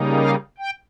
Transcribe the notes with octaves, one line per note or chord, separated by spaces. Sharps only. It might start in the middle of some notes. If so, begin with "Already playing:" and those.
Already playing: C#3 G3 A#3 D#4
F5
G5